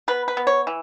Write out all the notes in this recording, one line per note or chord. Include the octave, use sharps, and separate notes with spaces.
B3 B4
B4
B3
C#5
E3